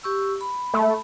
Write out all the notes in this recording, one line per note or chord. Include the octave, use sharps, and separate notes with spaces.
G4 C#6 E6
B5
A3